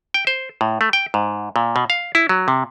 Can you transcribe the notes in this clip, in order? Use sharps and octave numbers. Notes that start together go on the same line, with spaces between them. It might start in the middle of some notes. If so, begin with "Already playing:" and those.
G5
C5
A2
A3
G5
G#2
A#2
B2
F5
E4
F#3
C3